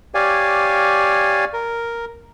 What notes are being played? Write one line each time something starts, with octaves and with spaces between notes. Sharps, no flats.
G4 C#5 D5 F5 G#5
A#4